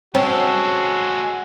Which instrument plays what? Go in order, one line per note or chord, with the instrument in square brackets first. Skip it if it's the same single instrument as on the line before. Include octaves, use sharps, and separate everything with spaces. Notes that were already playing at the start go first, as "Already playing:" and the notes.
[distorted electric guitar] G#3 A4 [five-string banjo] C4 C5 C#5 [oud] C#4 [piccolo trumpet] F#4